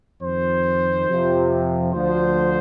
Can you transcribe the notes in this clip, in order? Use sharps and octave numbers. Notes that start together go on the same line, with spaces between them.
F2 D#3 C5
F2 C3 F3
D2 D3 F3 C5